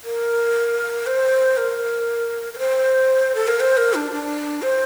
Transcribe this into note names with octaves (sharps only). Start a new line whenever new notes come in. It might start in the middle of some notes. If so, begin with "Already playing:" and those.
A#4
C5
A#4
A#4
C5
A4
A#4
C5
A#4
D4
D4
C5